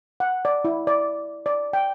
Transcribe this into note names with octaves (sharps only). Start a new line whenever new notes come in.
F#5
D5
E4
D5
D5
G5